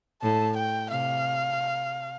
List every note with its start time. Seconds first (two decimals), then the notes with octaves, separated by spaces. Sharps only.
0.22 A2 A5
0.57 G5
0.91 C3 F5